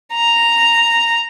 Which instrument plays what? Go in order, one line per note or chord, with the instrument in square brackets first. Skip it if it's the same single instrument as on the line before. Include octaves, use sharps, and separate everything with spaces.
[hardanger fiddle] A#5